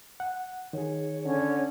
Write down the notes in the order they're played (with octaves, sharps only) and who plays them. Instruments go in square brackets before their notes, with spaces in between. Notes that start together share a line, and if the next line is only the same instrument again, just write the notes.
[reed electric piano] F#5
[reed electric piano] D#3 G#4 [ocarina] C#5
[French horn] D3 [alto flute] C#4